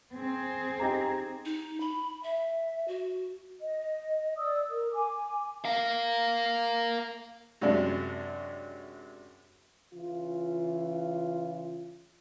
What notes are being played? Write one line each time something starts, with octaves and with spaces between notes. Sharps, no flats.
C4 G#4
D#4 G4 A#5
D#4
B5
E5
F#4
D#5
D5 D#6 E6
A#4
G#5 D6
A#4 F5
F#2 C3 F#3 G#3 D4
C#3 E3 F4